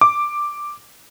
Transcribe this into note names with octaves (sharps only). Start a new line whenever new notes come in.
D6